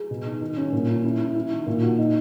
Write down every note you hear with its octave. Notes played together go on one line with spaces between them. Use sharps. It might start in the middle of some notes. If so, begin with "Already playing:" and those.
Already playing: G#4
B2
D#4
D#3
C#4
A#2
C#4
E4
E4
E4
D#3
A#2
F#4
D#4